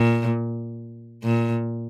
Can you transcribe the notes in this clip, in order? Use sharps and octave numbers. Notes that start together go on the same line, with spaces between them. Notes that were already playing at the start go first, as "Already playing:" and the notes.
Already playing: A#2
A#2